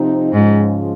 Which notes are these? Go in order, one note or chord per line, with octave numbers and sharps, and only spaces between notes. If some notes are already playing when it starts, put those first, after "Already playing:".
Already playing: C3 F3 C4 D#4
G#2 C#3 F3 G#3 C#4 F4